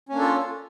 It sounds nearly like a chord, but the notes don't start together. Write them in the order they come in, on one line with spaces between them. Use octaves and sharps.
C#4 A#3 D4 A4 F4